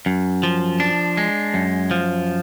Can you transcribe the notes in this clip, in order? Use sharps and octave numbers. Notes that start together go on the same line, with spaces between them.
F#2
F3
D4
G#3
F#2
F3